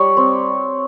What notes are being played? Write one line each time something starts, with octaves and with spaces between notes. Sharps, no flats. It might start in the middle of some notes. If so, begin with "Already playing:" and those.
Already playing: G3 C#5
C4